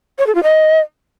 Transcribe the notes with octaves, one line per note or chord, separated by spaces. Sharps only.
C#5
A4
F4
D#5